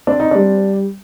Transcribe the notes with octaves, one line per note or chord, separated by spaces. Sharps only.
C4 D4
D#4
G3 D4